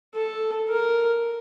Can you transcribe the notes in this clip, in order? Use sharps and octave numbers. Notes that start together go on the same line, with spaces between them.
A4
A#4